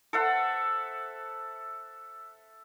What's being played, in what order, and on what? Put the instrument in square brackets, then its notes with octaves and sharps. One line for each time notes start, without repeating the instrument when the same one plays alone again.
[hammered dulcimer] A4 C5 E5 F#5